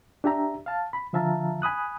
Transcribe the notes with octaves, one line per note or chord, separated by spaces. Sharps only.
D4 G4 E5 A#5
F5 A5
B5
D3 F3 E5 F5 A5 A#5
G#5 B5 D#6 F#6